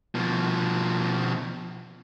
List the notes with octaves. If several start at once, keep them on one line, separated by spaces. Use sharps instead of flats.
B2 F3